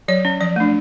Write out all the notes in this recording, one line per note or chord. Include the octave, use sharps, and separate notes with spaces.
F#3 C#5
C#4
F3 D5
A3 D4